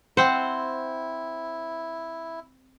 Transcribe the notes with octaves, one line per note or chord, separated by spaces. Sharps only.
C4 E4 C5 F#5